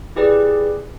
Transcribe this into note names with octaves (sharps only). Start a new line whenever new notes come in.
E4 G4 G#4 B4 D5